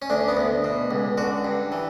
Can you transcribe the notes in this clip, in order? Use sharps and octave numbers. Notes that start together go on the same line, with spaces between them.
C#4
D2 D4
B3
D2
B2
C#2
D3 F#4
G2
E3